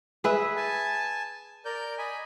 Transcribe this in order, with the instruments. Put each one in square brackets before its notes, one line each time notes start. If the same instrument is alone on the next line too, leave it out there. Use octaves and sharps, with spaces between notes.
[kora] G#4 B4 E5
[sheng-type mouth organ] G#5 A5
A#4 D5 G6
D#5 G#5 B5